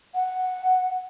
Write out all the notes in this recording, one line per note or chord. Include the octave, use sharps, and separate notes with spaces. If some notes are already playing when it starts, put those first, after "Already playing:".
F#5